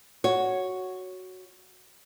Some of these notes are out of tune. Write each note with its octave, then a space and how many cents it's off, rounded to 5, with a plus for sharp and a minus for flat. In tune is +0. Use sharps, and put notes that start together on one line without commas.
F#4 +0 C#5 +0